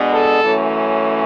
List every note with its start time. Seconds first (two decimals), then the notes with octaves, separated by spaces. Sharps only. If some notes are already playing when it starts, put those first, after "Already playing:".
Already playing: B2 G#3 B3 D4
0.13 A4
0.44 F#2 E3 A3 C#4